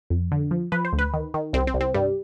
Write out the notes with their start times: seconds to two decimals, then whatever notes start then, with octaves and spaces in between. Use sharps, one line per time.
0.10 F2
0.32 D3
0.51 F3
0.72 F3 B4
0.85 C5
0.93 D2
0.99 B4
1.14 D#3
1.34 D#3
1.53 C2 C4
1.67 C4
1.74 C2
1.81 C4
1.94 G2 G3